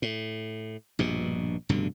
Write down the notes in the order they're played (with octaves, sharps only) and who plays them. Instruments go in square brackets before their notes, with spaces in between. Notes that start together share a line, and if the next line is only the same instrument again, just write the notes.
[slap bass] A2
A#1 G2 B2
F1 G2 B2 D3